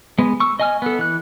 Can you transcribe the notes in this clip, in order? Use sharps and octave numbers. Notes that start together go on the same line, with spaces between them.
G#3 B3
C#6 E6
D#5 G#5 F6
B3 A4
E3 F#6